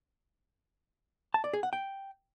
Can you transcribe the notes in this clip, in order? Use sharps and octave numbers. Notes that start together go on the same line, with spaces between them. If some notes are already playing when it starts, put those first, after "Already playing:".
A5
D5
G#4
F#5
G5